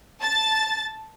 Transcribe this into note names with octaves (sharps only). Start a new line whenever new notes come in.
A5 A6